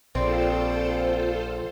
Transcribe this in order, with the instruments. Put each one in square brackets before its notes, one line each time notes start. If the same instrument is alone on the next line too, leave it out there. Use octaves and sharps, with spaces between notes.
[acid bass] A#1 [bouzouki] C4 [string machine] F4 A4 C5 [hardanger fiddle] D5